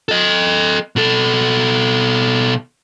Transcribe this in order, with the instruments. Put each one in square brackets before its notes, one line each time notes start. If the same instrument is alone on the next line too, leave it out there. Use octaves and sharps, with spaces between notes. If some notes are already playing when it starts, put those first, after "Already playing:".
[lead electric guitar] A4 D#5
B2 A4